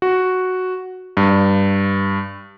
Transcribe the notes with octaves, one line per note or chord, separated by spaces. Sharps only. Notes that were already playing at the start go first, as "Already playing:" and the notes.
F#4
G2